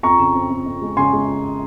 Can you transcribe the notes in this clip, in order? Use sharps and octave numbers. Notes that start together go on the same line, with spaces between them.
F2 A#5 C#6
C#3
C4
F2
F2
G#3
C#3 G#5 C6
G#3